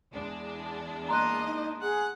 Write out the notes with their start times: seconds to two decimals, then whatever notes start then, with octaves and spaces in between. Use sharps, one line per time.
0.13 E2 G#3 D4
1.09 A#3 D#5 A#5 C6 F#6
1.45 D#4
1.81 G#4 F#5